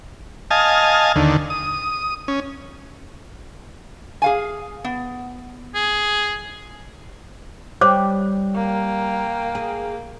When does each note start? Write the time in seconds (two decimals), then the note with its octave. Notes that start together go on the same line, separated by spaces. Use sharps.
0.51 D#5 F5 G#5 A5
1.16 D#2 D3
1.50 D#6
2.28 C#4
4.22 G#4 F5 G#5
4.84 B3
5.75 G#4
7.81 G3 C5 C#5 D6
8.55 A#3 G5
9.55 G#4